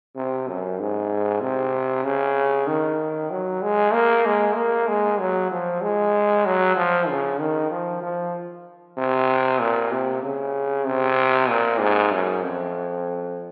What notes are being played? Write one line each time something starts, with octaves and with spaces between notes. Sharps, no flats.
C3
F#2
G#2
C3
C#3
D#3
F#3
G#3
A#3
G#3
A#3
G#3
F#3
F3
G#3
F#3
F3
C#3
D#3
F3
F3
C3
A#2
C3
C#3
C3
A#2
G#2
F#2
F2